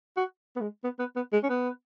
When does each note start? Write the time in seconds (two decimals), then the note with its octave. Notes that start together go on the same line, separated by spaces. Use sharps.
0.17 F#4
0.56 B3
0.61 G#3
0.84 B3
0.99 B3
1.16 B3
1.33 G#3
1.43 C#4
1.49 B3